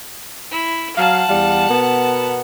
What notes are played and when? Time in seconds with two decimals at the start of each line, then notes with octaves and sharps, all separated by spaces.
0.51 E4
0.96 F#3 F5 F#5 A5
1.28 E2 G3 F5
1.67 B2 B3 A#4